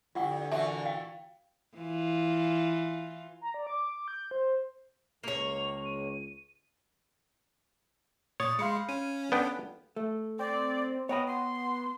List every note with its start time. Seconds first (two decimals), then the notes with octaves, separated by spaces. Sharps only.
0.15 G2 D3 E4 F4 F#5 C#6
0.52 A#2 E3 F#4 E5 A5
0.85 F5 G5
1.77 E3 F4
3.41 A#5
3.54 D5
3.67 D6
4.08 G6
4.31 C5
5.24 C#2 A#3 C#5 F7
5.85 D#7
8.40 A#2 C#5 D#6 A6
8.59 G#3 F5 B5 C6 G6 C#7
8.89 C#4 D#7
9.32 B3 D4 A4 B4 G5
9.96 A3
10.39 C4 D5
11.09 B3 C#5 D#5 G5 B5
11.27 C6